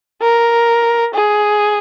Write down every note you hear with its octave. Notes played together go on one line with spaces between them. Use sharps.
A#4
G#4